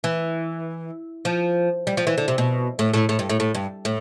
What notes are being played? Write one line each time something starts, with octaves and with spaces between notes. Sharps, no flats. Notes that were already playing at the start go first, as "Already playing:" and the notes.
E3
F3
G3
F3
E3
D3
C3
B2
A2
A2
A2
G2
A2
A2
G2
A2